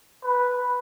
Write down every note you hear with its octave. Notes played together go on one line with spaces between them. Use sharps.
B4